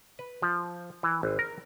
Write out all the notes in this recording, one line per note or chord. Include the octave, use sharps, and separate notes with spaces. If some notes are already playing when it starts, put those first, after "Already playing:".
B4
F3
E3
G#1
A#4